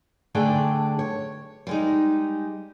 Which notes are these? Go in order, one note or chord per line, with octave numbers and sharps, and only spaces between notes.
D3 A3 D4 G#4 D5 G5
C#5
G3 G#3 D#4